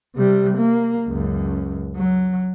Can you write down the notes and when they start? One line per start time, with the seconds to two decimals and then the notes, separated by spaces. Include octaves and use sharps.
0.16 C3 G3
0.57 A#3
1.08 C#2 F#2
1.96 F#3